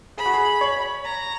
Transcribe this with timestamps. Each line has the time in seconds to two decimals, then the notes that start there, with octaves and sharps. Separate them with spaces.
0.17 G#4 B5
0.26 F#4
0.34 G#4
0.61 C#5
1.05 A#5